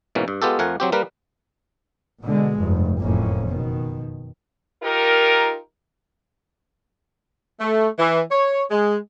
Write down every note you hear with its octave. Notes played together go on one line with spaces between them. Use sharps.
G#2 B2 E3 A#3 C#4
G2
G#3 B3 F4 G4 A4
F2 F3 A3 A#4 F#5 G#5
F#3 C4 G4
G3 A#3 A#4 B4
B2 D3 G#3
F1 G2
F#1 F2 A2 A#3 C#4
B2 D#3
D#4 F4 G4 A#4
A3
E3
C#5
G#3